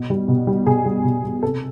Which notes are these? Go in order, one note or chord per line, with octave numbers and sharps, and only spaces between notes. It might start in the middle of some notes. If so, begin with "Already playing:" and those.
Already playing: B2
G3
B2
G3
B2 G#4
G3
B2
G3
C3 A4